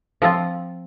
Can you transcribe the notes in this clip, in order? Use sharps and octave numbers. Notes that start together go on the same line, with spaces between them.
F3 C4 F4